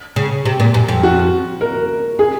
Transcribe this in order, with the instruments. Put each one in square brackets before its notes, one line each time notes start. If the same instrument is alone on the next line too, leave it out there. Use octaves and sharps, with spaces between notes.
[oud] C#3
C3
A#2
F#2
F2
[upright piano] F#4
A#4
G#4